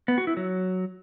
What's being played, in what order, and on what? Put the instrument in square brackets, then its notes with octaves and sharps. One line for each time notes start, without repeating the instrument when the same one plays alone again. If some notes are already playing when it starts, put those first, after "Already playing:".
[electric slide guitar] B3
F#4
E4
F#3